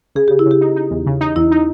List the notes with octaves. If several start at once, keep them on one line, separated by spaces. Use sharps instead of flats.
C#3 G#4
C#3 G4
E4
C#3
G4
D#4
D#4
E2
C#3
D#4
E2 E4
D#4